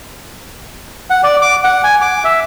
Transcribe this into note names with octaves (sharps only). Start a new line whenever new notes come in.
F#5
D5
D6
F#5
G#5
D6
E5